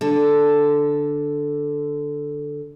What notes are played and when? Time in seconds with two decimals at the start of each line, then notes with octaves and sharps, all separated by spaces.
0.01 D3 A4